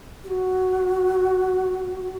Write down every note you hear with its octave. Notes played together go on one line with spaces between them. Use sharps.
G4
F#4